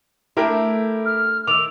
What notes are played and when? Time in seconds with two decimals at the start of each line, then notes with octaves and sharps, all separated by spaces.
0.37 A3 D4 E4 G4 A#4
1.06 F6
1.47 D#3 D6 E6 F7